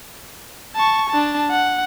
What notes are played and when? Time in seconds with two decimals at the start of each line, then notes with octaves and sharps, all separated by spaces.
0.75 A5 C#6
1.09 D4 A5
1.51 F#5